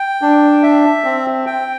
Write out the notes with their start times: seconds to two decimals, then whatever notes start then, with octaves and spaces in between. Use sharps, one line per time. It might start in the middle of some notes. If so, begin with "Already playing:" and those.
Already playing: G5
0.22 D4
0.63 E5
1.04 C4
1.46 G5